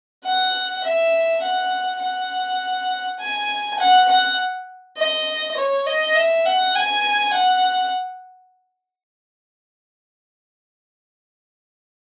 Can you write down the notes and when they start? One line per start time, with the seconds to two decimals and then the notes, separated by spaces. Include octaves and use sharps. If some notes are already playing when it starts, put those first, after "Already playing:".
0.24 F#5
0.84 E5
1.43 F#5
2.02 F#5
3.20 G#5
3.80 F#5
4.09 F#5
4.97 D#5
5.57 C#5
5.86 D#5
6.16 E5
6.45 F#5
6.75 G#5
7.33 F#5